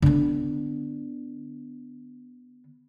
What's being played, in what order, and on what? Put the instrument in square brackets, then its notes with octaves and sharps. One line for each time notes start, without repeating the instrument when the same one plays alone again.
[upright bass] D3 B3